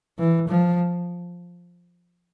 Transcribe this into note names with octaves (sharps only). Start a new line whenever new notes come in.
E3
F3